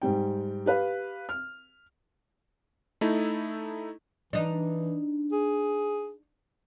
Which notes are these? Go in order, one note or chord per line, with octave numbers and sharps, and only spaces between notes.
G#2 G3 G5
G4 B4 F5
F6
A3 D#4 E4 A4
E3 D4 D#4
G#4